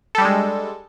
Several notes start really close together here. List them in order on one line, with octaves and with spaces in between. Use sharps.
A4 G3 D4 G#3